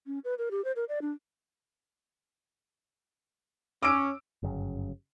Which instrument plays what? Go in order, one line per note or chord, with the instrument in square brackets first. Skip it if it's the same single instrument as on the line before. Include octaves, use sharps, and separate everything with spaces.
[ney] C#4
B4
A#4
G4
C5
A#4
D5
D4
[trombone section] C#4 [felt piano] D6 E6 D7
[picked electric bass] G1 F#2 C#3